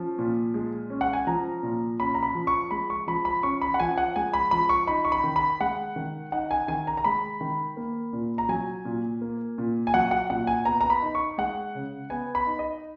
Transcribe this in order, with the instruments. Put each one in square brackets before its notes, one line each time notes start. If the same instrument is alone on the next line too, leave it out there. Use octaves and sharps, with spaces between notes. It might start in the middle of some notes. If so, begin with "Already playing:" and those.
Already playing: [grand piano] F3 C#4
A#2
G#3
C#4
F#5
G#5
F3 A#5
A#2
C#4 B5
A#5
B5
F3
C#6
G#3 B5
C#6
F3 B5
B5
C#4 C#6
B5
F#5
F3 G#5
F#5
G#3 G#5
B5
F3 B5
C#6
D#4 B5
C#6
B5
D#3
B5
G#3 F#5
D#3
D#4 F#5
G#5
D#3 G#5
A#5
A#5
G#3 B5
D#3
A#3
A#2
A#5
F#3 G#5
A#2
A#3
A#2
G#5
F#3 F#5
F#5
A#2 F#5
G#5
B3 A#5
A#5
B5
D#4
C#6
G#3 F#5
C#3
B3 G#5
B5
D#4
D#5